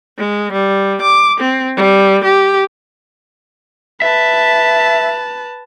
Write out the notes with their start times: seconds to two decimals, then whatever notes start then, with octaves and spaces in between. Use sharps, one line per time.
0.18 G#3
0.53 G3
1.02 D6
1.40 C4
1.77 G3
2.24 G4
4.02 B4 E5 A5